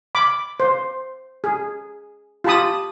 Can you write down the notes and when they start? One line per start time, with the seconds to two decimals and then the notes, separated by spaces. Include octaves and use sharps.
0.15 B5 D6
0.60 C5
1.44 G#4
2.44 F4 G4 A5 B5 D#6